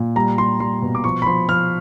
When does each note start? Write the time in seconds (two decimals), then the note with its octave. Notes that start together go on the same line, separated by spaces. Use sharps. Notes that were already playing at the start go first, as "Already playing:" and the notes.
Already playing: A#2
0.16 G3 A#5
0.38 G3 C6
0.60 G3 C6
0.82 B2
0.95 D6
1.04 F3 C#6
1.22 B5
1.27 F3 C6
1.49 F3 F6